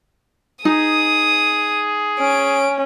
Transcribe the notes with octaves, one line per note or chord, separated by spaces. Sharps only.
D#4 G#4 D#6
C#4 D7